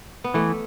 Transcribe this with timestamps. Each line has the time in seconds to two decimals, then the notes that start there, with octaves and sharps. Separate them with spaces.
0.24 B3
0.34 E3 A3